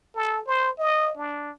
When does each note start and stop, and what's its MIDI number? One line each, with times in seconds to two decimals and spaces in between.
0.15 0.41 69
0.47 0.71 72
0.79 1.12 75
1.17 1.51 62